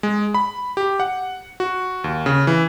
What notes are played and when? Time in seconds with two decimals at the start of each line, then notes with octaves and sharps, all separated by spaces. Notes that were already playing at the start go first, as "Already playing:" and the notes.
0.03 G#3
0.34 B5
0.77 G4
1.00 F#5
1.60 F#4
2.04 D#2
2.26 C#3
2.47 E3